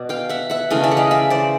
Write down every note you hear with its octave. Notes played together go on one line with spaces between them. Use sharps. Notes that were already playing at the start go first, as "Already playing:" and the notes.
Already playing: B2 D5
F5 G5
E5 F#5
E5 F#5
C#3 E3 A3 D#5 F5
D5 E5
F#5
D#5 F5
D5 E5
C5 D5